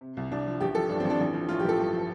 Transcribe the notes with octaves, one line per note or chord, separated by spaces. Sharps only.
C3
C2
C2 D4
F3
A1 G4
F3 A4
G2 D4
C4
A1
D4
A1
F3
A2 F4
G4
A1 A4
G2
F3